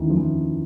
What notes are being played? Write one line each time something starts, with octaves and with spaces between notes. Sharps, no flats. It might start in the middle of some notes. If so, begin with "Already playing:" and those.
Already playing: D#2 D#3 E3 C#4 E4
F3
E3